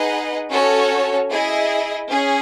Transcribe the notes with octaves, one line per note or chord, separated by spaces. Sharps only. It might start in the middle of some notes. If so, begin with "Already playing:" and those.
Already playing: D#4 G#4 B4 D#5 F#5
C#4 F#4 A4 C#5
E4 G#4 D#5
C#4 G#4